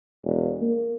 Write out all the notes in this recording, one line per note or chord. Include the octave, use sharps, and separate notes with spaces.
E1
A#3